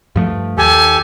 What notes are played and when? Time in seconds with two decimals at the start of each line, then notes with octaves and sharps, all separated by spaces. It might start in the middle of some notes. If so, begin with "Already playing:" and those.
0.16 G2 F3 A3
0.58 D#2 G4 A4 G#5